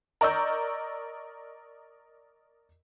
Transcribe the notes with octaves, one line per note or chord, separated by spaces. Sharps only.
A#4 D5 D#5 C#6 E6 G6